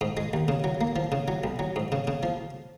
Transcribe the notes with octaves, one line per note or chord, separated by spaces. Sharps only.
G#2
G#3
D#2
C#3
F#3
A#3
F3
C#3
F#3
B1
F#3
G#2
C#3
C#3
F3